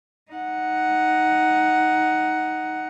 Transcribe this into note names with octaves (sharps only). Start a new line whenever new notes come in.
D#4 F#5